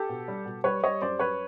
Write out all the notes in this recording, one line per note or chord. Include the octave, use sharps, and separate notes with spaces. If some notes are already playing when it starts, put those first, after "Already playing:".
Already playing: G4 A4
B2
G3
B2
G3 B4 C#5
G3 C#5 D#5
F#2 C5 D5
F#2 B4 C#5